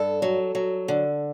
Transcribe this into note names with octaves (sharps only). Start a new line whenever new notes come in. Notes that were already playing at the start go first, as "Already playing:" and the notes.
Already playing: G2 A4
F#3
F#3
D3